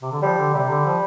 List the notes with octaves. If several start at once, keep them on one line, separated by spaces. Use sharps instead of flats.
C3
D3
F3 G3
D3
C3 G3
D3
F3